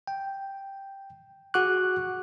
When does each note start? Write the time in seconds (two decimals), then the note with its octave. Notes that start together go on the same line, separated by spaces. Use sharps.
0.07 G5
1.54 F#4 G#4 F#5 C#6 D6 F#6